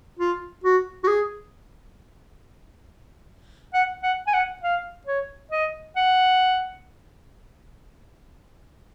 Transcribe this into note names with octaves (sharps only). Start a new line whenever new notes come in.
F4
F#4
F#4
G#4
F#5
F#5
G#5
F#5
F5
C#5
D#5
F#5